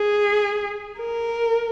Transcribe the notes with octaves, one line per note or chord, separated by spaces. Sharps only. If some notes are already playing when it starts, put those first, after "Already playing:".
Already playing: G#4
A#4